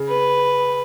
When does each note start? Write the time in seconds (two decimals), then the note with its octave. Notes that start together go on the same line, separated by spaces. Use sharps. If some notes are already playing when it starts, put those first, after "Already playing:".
Already playing: C#3
0.09 B4